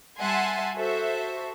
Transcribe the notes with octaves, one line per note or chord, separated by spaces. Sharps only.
G3 E5 F#5 G#5 A5 C6
F#4 A4 C5 E5